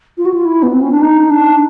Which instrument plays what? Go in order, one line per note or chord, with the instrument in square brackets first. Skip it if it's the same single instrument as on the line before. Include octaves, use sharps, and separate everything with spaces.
[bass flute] F4
F#4
F4
E4
B3
C4
C#4
D4
D#4
D4